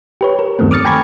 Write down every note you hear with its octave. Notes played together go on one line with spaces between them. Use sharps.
G4 B4 C#5
A#4
E2 G2 D#3 A3 B3 C4
D6 D#6 F6 A6 C#7
G5 G#5 A#5 B5 C#6 G#6